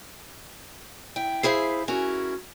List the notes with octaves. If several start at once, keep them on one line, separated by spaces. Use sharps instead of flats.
E4 G5
E4 G#4 C5 E5 F5
C#4 E4 F#4 A#4